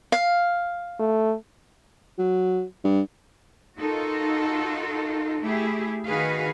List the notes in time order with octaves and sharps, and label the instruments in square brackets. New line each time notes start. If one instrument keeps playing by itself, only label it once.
[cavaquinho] F5
[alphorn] A3
[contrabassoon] F#3
G2
[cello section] D#4 F4 F#4 A4 A#4
A3 E4 G4 G#4
D#3 F#4 G#4 B4 F5